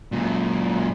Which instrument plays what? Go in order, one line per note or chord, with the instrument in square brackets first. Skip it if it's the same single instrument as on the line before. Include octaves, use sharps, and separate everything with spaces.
[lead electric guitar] F#2 A#2